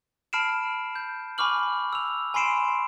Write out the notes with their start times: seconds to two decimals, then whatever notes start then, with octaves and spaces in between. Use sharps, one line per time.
0.33 A5 B5 F6 C7 D7 E7
0.96 G6
1.38 G#5 B5 C#6 D6 F6 F#7
1.93 E6 F7
2.34 G#5 B5 C6 C7 D7 E7